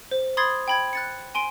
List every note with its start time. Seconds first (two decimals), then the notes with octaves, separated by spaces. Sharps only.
0.11 C5
0.37 B5 C6 D#6 G#6 A6 C7
0.68 G5 B5 G#6
0.93 F#6 A6 C#7
1.35 G#5 C6 D7